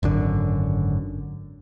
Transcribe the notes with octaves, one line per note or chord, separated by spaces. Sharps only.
G#1 F#2 D3